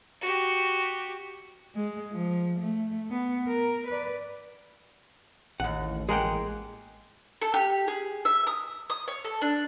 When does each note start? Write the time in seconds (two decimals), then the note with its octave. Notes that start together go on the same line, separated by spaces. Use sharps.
0.21 F#4 G4
1.76 G#3
2.13 F3
2.60 A3
3.11 B3
3.47 A#4
3.87 B4 D5
5.60 A1 D#2 F#5
6.09 G#3 A#3 G#4 F#5 G5
7.41 A4
7.54 G4
7.88 G#4
8.25 E5
8.47 D#6
8.90 D#6
9.08 C#5
9.25 A4
9.41 D4